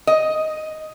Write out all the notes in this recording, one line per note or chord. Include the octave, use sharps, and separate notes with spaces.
D#5